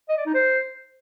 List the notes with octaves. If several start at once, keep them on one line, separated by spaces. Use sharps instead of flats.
D#5
D5
D#4
C5